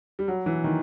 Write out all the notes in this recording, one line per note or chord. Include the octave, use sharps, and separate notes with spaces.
G3
F#3
E3
D#3